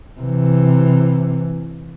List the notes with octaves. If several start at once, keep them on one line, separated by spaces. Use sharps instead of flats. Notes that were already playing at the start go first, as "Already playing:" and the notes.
C3 E3